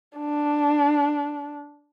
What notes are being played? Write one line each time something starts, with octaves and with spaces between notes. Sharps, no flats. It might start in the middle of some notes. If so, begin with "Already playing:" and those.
D4